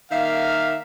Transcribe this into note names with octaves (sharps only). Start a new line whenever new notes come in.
D#3 A#3 E5 F5